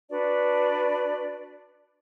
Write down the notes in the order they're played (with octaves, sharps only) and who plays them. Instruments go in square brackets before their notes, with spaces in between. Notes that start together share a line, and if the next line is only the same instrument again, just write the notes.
[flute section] D4 F#4 B4 D5